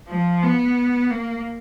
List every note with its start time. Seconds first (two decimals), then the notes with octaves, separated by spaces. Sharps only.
0.08 F3
0.43 B3
1.10 A#3